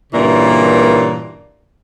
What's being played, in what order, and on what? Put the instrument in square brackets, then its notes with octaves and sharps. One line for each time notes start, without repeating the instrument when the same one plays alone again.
[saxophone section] G2 A#2 C#3 E3 A#4 D5